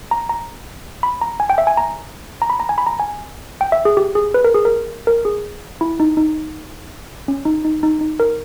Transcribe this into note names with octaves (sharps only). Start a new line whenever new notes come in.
A#5
A#5
B5
A#5
G#5
G5
E5
G#5
A#5
A#5
B5
A#5
G#5
B5
A#5
G#5
G5
E5
G#4
G4
G#4
B4
A#4
G#4
A#4
A#4
G#4
E4
D#4
D#4
C#4
D#4
D#4
D#4
D#4
A#4